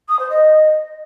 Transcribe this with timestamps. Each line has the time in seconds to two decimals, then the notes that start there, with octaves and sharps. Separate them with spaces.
0.09 D#6
0.19 C5
0.30 D#5